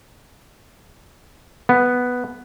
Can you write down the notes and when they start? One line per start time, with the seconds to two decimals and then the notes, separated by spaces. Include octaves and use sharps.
1.69 B3